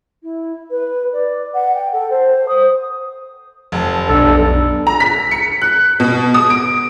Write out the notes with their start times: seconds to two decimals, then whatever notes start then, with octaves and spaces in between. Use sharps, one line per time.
0.23 E4
0.70 B4
1.13 D5
1.54 F#5
1.75 G5
1.93 A4
2.10 C5
2.48 D#6
3.72 F1 A5
4.09 F1 B1 D4 A4
4.87 A#5
5.00 B6
5.31 C#7
5.62 F#6
6.00 B2
6.34 D#6
6.50 D7